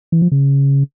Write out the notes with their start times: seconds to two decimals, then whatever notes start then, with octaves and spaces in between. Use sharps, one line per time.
0.12 E3
0.22 F3
0.32 C#3